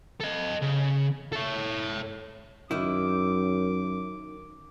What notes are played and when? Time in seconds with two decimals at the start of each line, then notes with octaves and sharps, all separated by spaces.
0.21 A4 D#5
0.62 C#3
1.33 A4 C#5
2.71 F#2 D#3 E4 D6